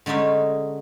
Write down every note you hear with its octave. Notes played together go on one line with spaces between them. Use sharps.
D3 G#3 A3 C#4 D#4